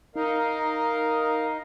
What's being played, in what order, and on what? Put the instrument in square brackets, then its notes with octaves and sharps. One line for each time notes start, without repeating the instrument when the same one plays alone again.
[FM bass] D#4 [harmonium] A#4 D#5 F5